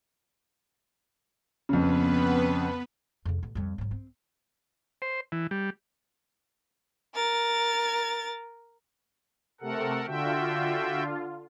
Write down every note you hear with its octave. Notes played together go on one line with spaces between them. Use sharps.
F2 C#3 B3 B4
F2 C#3
A1
F2 G3
G#2 F#3
C4
C5
E3
G3
A#4 A6
C3 A3 A4 A#4 F#5
D3 F4 F#4 E5 G5